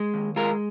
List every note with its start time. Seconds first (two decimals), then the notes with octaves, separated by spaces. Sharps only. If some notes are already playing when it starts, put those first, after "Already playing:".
Already playing: G#3
0.14 D#2
0.36 G#3 F4 A#4